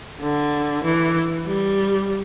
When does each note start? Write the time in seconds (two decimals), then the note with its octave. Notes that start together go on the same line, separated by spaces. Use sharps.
0.22 D3
0.84 E3
1.47 G3